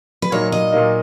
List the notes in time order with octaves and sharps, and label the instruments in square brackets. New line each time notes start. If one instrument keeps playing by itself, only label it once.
[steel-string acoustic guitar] B4
[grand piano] A#2 F#3 A#3 D#4 [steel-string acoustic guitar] C#5
[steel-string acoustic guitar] D#5
[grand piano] A#2 F#3 A#3 D#4